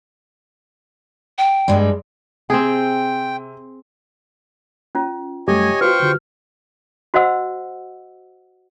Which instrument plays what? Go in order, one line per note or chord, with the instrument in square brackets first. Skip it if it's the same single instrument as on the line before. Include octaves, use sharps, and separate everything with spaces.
[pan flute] G5
[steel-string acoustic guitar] G2 G3 G#3
[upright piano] C3 [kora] C4 G#4 [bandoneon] G5
[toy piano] C#4 F4
[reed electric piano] F#2 G3 A3 [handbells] G4 [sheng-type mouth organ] C#5 D#5 G#5
[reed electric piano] F4 F5 [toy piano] F#4 B4 [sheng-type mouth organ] C5 G5 C#6 [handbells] F6
[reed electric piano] D3 F4 G4
[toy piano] F#4 C5 D#5 F#5 E6